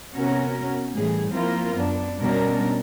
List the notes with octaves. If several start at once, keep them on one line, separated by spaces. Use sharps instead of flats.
C3 B3 C#4 F#4 A#4
A2 E3 G3 G#4
F3 A#3 C4 E4 F4 A#4
F#2 B3 D4
B2 G3 B3 C#4 D4 A#4